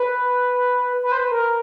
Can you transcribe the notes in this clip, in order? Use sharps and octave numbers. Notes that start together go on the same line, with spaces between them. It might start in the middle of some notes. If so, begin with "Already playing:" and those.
Already playing: B4
B4
C5
B4
A#4